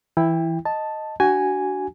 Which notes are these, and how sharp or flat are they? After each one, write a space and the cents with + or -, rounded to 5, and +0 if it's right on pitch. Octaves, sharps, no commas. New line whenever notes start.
E3 +0 E4 +0 G5 +25
D#5 +0 A5 +0
D4 +0 F#4 +25 G#5 +0